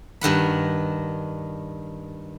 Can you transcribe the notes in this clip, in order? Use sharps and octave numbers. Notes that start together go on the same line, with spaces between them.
G2 D#3 F#5 B5